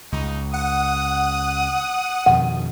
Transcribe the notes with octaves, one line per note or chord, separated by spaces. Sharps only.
C#2 D#4
F#5 D#6
F2 B2 D#3 F#5